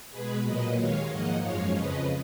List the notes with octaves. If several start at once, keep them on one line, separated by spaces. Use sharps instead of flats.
B2 G#3 G#4 B4
A#2 F#3 A#3 B4 D#5
D#2 D#3 G#3 C#5 F5
G#2 F3 A#3 D#5 F#5
F#2 F3 G#3 C#5 F5
F2 C#3 F3 B4 D#5